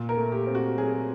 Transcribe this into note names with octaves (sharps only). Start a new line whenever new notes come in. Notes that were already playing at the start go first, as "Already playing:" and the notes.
Already playing: A#2
A#4
A3
G4
C4
F#4
F#3 G#4